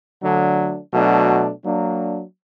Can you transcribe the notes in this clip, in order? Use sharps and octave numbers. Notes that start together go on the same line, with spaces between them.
D3 F#3 A3 D4
B2 F#3 A3 D4
F#3 A#3 D4